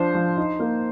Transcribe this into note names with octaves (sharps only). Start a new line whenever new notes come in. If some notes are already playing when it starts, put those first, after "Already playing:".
Already playing: F3 D4 C5
F3
D#4
A#3